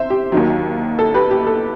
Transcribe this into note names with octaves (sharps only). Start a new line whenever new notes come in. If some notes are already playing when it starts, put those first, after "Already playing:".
Already playing: C3 C5 E5
G4
D#2 D#3 F#3
A4
G4 B4
G4
A4